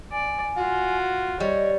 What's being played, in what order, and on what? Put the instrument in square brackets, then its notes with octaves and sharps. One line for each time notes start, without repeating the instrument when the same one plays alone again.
[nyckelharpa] D5 [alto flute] G#5
[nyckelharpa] F4 [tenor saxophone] F#4
[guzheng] G3 [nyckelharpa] C#5 [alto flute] D#5